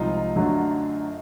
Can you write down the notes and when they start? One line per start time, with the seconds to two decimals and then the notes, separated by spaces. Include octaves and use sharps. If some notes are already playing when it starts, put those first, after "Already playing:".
Already playing: C2 C3 F3 G#3 D#4 F4
0.36 F#2 D3 F#3 A3